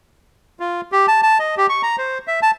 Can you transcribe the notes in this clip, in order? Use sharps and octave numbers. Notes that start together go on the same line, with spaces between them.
F4
G4
A5
A5
D#5
G4
C#6
A#5
C5
E5
A5